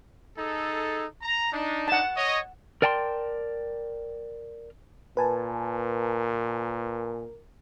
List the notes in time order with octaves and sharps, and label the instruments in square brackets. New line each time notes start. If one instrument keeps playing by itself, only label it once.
[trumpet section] D#4 G#4 A4
A#5
D4 D#4
[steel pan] F#5 A5
[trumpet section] C#5 D#5
[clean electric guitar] A#4 D5 G5 A5 A#5 C6
[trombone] A#2 [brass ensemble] A#4 [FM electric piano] B4 G#5 A5